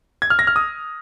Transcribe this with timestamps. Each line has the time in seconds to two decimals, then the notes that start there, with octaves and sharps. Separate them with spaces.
0.22 G#6
0.30 F6
0.39 A#6
0.47 F6
0.56 D#6